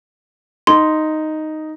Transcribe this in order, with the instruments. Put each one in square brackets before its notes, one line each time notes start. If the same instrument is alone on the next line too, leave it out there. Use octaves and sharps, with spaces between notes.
[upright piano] D#4 [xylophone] C6